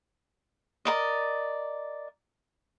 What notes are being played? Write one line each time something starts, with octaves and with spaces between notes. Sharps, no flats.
A#4 D5 D#5